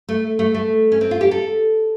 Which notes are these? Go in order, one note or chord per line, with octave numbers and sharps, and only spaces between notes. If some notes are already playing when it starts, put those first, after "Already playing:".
A3
A3
A3
C#4
C4
F4
G4
A4